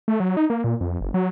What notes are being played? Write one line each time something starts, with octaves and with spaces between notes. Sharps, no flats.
A3
F#3
D#4
A#3
A#2
F2
F#1
F#3